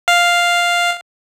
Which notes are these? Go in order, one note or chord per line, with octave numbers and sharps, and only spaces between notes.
F5